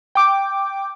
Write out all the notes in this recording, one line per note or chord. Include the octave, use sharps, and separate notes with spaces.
G5 D6